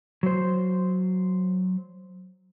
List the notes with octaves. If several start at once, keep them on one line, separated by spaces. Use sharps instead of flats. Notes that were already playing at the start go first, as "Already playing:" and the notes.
F#3 C5